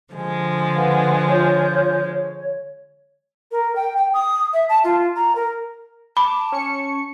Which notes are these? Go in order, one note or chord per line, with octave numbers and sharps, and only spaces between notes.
D3 F3 G#3
B4 F5 F#5
F4 C#5 G6
C#5
A#4
G5
G5
D#6
E5
A5
F4
A#5
A#4
A5 B5 D6
C#4 C#6 C#7